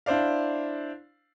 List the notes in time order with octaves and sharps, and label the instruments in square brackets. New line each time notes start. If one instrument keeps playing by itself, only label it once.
[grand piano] D4 E4 C5 D5 F5